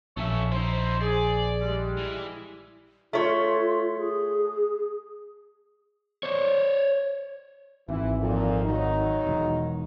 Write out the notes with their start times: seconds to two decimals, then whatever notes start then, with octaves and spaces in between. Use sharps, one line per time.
0.17 A#1 F#2 A3 C#4 C#5 E5
0.52 D#4 E4 C5
1.01 G#4 D5
1.62 G3 G#3
1.97 E3
3.13 A3 F4 C#5
3.98 G#4
6.23 C5 C#5
7.89 G#1 E3 E4
8.20 F2 A#2
8.65 D#3 F#3 D#4
9.27 E1